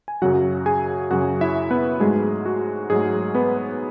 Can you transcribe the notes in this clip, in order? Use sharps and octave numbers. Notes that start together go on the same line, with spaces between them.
G#5
F#2 C#3 F#3 F#4 F#5
G#4 G#5
F#2 C#3 F#3 F#4 F#5
E4 E5
B3 B4
G#2 F#3 G#3 A3 G#4
F#4
G#2 F#3 G#3 A3 G#4
B3 B4